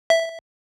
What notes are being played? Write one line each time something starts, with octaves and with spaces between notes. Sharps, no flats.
E5